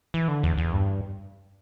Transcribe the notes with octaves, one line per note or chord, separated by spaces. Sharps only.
E3
D3
E2
E2
G2